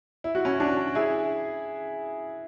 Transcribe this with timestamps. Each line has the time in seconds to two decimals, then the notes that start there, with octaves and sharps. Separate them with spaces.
0.24 E4
0.35 F#4
0.45 C#4 E4
0.60 D4 F#4
0.95 E4 G#4